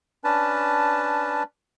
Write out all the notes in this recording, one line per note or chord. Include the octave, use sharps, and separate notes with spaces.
C#4 D4 B4 A5